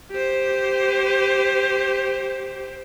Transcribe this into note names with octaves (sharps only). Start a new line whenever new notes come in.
G4 C5